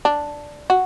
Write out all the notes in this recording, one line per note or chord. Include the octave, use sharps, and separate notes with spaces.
D4
F#4